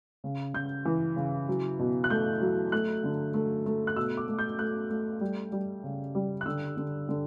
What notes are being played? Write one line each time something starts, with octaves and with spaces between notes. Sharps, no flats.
C#3
C#3 G6
E3
C#3
F#3
B2
F#6
A3 G6
F#3
A3 F#6
D3
A3
A3
F#6
B2 E6
D6
A3
G6
A3 F#6
A3
G3
G3
C#3
G3
F#6
D3 E6
D3
D3